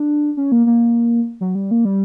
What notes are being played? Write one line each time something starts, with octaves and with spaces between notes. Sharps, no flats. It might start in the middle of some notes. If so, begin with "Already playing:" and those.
Already playing: D4
C#4
A#3
A#3
F#3
G3
A#3
G3